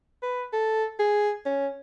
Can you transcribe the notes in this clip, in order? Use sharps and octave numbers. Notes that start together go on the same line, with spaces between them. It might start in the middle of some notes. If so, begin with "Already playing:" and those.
B4
A4
G#4
C#4